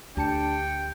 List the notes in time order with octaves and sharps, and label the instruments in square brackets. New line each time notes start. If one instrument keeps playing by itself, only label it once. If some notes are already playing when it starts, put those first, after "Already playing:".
[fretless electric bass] D2 [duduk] D4 [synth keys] G4 A5 C#7 [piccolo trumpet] G5